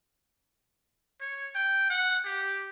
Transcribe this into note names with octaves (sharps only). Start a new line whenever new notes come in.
C#5
G5
F#5
G4